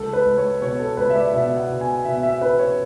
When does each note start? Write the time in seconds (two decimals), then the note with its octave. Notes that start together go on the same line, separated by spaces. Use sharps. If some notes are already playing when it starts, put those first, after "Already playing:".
Already playing: C#2 A4
0.13 B4
0.25 C#2
0.37 C#5
0.61 B2 C#5
0.79 A4
0.97 C#2 B4
1.10 E5
1.15 D5
1.33 B2 E5
1.57 F#5
1.69 B2
1.81 G#5
2.05 B2 E5
2.23 E5
2.41 C#4 B4
2.59 C#5